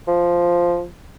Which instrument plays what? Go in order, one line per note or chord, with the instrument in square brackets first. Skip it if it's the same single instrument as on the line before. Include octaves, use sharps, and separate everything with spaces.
[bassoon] F3